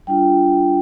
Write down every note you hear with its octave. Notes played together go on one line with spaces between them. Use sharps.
G3 D4 F4 G5